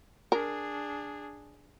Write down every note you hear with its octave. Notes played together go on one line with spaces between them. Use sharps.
D4 G#4 A#4